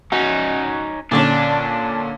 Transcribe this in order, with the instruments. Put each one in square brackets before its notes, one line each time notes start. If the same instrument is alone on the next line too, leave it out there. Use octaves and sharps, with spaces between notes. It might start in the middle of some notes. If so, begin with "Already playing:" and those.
[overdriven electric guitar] C#4 D#4 [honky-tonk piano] F#4
[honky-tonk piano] A#2 D3 C#4 [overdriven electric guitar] D4